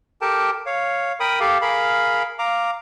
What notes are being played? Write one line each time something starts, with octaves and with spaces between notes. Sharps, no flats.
G4 A4 A#4 G5 A5
C#5 F5
A#4 G5 B5 D#6
G4 A4 F5
G#4 A#4 F5 B5
F5 A#5 D6